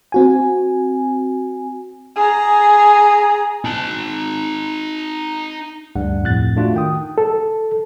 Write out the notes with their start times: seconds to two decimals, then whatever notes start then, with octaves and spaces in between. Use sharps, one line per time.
0.12 C4 F#4 G#5
2.16 G#4 A#5
3.65 D#4 A5
5.96 D2 G2 G3 F#5
6.23 F2 A2 F#6 A6
6.56 A3 D4 F4 F#4
6.74 D#3 G5 D#6
7.18 A4